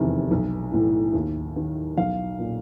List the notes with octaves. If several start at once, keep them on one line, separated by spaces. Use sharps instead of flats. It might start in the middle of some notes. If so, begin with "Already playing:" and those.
Already playing: F1 E2 C3 D#3
B1
A2 E3
D#2
D#3
B1 F5
A#2